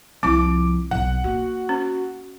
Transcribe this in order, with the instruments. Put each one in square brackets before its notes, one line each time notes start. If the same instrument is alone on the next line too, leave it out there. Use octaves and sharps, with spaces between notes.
[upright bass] C2 F3 [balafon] C4 E4 [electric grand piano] D6
[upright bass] B1 [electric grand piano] F#5
[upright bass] A#3 [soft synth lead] F#4
[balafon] C#4